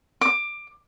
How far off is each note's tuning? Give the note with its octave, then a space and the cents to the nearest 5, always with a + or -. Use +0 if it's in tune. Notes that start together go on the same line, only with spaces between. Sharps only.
D6 +20